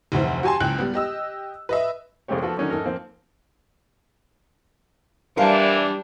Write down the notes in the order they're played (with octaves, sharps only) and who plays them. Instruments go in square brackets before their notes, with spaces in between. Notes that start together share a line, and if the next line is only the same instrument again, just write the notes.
[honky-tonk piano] F1 D2 E3 C5
F#4 G4 G#5 A5 C6
F#1 C#2 G5 F#6
G3 B3
G4 D#5 E6
B4 D#5 E5
[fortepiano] C2 F2 G#3 C4 G4 C#5
F3 F#4 A4 B4
D3 D#3 F#3 C#4 D#4
G#2 D#4 A4 A#4
F3 A#3 C4
[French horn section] E3 D4 [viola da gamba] G3 [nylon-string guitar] A#4 C5 F5